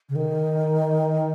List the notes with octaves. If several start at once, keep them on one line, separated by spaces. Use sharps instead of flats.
C#3
D#3